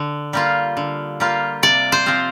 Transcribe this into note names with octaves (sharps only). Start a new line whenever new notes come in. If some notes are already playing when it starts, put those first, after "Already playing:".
Already playing: D3
G3 A#3 F4
D3
G3 A#3 F4
C3 D5
C5
F3 C4 F4